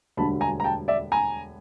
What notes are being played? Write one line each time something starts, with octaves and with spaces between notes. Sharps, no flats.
E1 D2 D3 G3 A5 B5
G#5 A#5
A#5
G5 A5
D5 E5
G#5 A#5